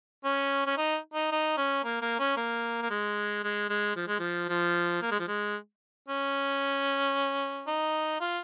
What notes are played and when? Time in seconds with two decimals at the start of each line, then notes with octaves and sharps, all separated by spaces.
0.25 C#4
0.67 C#4
0.78 D#4
1.14 D#4
1.32 D#4
1.58 C#4
1.84 A#3
2.02 A#3
2.19 C#4
2.37 A#3
2.82 A#3
2.91 G#3
3.44 G#3
3.70 G#3
3.96 F3
4.08 G#3
4.19 F3
4.49 F3
5.02 A#3
5.11 G#3
5.20 F3
5.28 G#3
6.09 C#4
7.67 D#4
8.20 F4